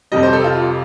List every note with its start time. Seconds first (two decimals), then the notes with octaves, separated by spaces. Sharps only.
0.12 F2 C3 G3 D#5
0.23 C5
0.33 A4
0.44 F4